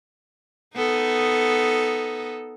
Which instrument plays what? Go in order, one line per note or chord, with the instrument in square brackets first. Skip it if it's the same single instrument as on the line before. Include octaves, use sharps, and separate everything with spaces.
[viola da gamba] B3 D#4 A4